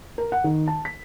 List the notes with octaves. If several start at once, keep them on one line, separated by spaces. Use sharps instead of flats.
A#4
F#5
D#3
A5
B6